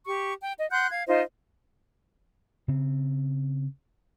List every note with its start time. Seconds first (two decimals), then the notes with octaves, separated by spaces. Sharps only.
0.06 G4 C#6
0.41 G5
0.58 D#5
0.71 F#5 C6 F#6 G6
0.90 F5 G#6
1.07 D#4 F4 C5 D#5
2.68 C#3 C4